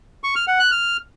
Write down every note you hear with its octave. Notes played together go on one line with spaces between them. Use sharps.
C#6
F6
F#5
F#6
F6